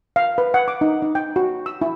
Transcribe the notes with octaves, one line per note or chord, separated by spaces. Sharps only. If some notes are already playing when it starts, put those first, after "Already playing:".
F5
B4
F#5
D6
D#4
D#4
G5
F#4
E6
E4